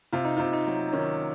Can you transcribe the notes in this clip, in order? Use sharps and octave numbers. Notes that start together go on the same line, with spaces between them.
C3 F4
D#4
F4
C3
D#4
F#3
D#3 C#4